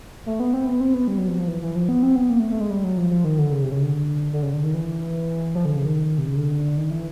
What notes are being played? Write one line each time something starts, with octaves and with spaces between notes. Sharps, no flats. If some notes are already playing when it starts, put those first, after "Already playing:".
A3
B3
C4
B3
C4
B3
G3
F#3
F3
F3
E3
E3
F3
B3
C4
B3
A#3
A3
A3
G#3
G3
F#3
F3
F3
D#3
D3
C#3
C3
C#3
D3
D3
C#3
D3
D#3
E3
F3
D3
C#3
D#3
C3
C#3
D3
D#3
E3